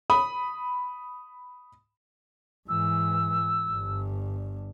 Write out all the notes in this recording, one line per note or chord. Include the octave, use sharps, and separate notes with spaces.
B5 D#6
G#2 E3 E6
G1 G2